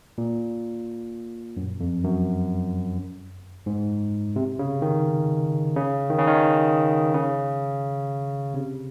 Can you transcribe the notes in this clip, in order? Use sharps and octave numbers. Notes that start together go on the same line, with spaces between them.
A#2
F#2
F2
F#2
G#2
C3
C#3
D#3
C#3
D#3
C#3
D#3
C#3
C3